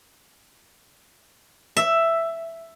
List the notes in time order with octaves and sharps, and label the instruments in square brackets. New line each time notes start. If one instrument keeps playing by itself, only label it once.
[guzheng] E5